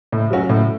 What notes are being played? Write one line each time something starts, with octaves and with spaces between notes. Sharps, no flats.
A2
F#3 C#4 F#4
A2